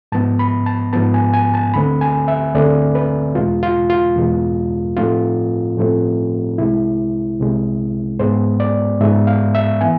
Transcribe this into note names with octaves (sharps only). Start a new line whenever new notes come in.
G#2 F3 B3 A5
B5
A5
G#2 F3 B3 A5
G#5
G#5
A5
D2 D3 A3 C4 B5
G#5
E5
D2 D3 A3 C4 D5
B4
E2 B2 G#3 F4
F4
F4
E2 B2 G#3
A2 F3 A3 C4 F4
A2 F3 A3 C4
C2 C3 G#3 E4
C2 C3 G#3
G#2 G#3 B3 C5
D5
G#2 G#3 B3 E5
F5
E5
E3 B3 G#5